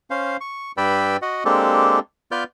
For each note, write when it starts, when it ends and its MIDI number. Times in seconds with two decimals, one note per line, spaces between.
0.10 0.37 61
0.10 0.37 72
0.10 0.37 77
0.41 0.72 85
0.77 1.17 43
0.77 1.17 71
0.77 1.17 74
0.77 1.17 79
0.77 1.17 83
0.77 1.17 88
1.22 1.44 66
1.22 1.44 75
1.22 1.44 78
1.45 1.99 56
1.45 1.99 58
1.45 1.99 60
1.45 1.99 62
1.45 1.99 67
1.45 1.99 69
2.31 2.44 59
2.31 2.44 65
2.31 2.44 71
2.31 2.44 74
2.31 2.44 89
2.31 2.44 91